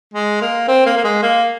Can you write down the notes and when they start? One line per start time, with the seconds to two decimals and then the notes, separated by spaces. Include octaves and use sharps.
0.14 G#3
0.42 A#3
0.68 C4
0.86 A#3
0.97 A#3
1.04 G#3
1.23 A#3